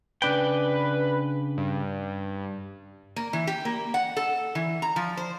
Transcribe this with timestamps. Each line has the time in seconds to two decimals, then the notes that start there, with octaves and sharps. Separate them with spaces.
0.22 C#3 D4 B4 G5
1.57 G2
3.16 A#3
3.33 E3
3.47 G4
3.65 A#3
3.94 F#5
4.17 A4
4.55 E3
4.82 A#5
4.96 F3
5.17 C5